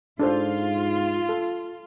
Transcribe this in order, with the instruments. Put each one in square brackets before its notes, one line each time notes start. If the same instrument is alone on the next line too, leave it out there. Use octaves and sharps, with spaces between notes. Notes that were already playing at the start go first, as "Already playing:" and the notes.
[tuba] G#2 [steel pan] D4 A4 C5 [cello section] F4
[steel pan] A4